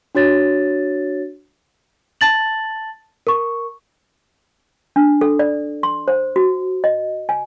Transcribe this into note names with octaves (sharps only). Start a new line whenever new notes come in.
D4 F#4 C#5 A6
A5 A6 F#7
A#4 C#6
D4
A4
D5
C6
C5
F#4
D#5
G#5